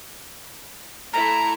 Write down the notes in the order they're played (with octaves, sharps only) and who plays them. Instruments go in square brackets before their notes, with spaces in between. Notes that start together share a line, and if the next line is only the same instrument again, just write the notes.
[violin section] A3 E4 [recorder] A#5